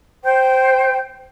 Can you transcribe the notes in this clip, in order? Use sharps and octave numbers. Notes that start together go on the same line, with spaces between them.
C5 G5 G6